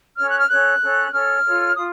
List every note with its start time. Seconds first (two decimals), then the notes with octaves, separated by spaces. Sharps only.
0.17 C#4 A4 C#5 F6
0.28 F#6
0.38 F6
0.49 C#4 A4 C#5 F#6
0.81 C#4 A4 C#5
1.12 C#4 A4 C#5 F6
1.44 F4 A4 C#5
1.76 F4 D#6